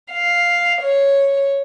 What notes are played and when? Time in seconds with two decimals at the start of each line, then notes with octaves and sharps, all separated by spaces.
0.11 F5
0.81 C#5